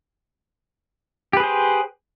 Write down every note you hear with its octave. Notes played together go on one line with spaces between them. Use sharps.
G4 G#4 B4 C5